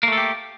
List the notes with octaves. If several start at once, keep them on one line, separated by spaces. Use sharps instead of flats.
A3 A#3 G4 A4